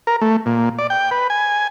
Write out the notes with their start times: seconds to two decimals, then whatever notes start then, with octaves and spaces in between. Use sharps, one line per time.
0.07 A#4
0.21 A3
0.46 A#2
0.79 D5
0.90 G5
1.11 B4
1.30 G#5